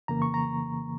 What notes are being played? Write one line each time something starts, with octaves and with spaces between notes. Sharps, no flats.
F2 C#3 E3 A#3 A#5
C#6
A#5